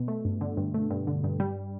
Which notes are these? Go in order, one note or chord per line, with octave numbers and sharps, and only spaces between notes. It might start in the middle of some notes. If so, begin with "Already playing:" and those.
Already playing: B2
A3
G2
D3
G2
A3
G2
D3
G2
G3